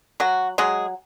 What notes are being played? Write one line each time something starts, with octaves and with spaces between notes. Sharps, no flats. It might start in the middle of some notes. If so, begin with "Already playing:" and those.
F#3 F#4
F#3 G#3 G#4